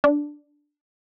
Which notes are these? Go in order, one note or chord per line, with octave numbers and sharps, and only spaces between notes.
D4